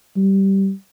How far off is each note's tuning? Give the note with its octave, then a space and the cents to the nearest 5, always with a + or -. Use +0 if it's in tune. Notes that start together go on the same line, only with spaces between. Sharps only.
G3 -10